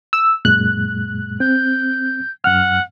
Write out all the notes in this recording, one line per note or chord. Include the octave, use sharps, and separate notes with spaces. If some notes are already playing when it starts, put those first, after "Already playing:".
E6
F#2 A#2 G#3 F#6
C4 G6
F#2 F#5 F6